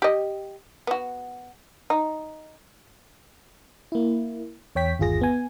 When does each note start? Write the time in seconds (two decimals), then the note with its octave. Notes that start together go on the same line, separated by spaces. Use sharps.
0.02 G4 D#5
0.87 B3 F#4
1.90 D#4
3.92 A#3 E4
4.75 E2 C#5 G5 B6
4.99 G1 D#2 F4 G#4 A#6
5.21 B3 G#5